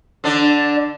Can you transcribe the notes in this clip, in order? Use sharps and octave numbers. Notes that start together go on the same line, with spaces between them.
D3 D4